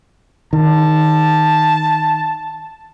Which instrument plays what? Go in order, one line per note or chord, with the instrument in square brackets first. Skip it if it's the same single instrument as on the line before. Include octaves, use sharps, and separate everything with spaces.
[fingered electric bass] D#3 [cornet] A5